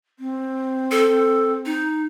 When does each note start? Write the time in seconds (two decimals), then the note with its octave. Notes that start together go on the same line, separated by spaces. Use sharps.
0.19 C4
0.91 A4
1.65 D#4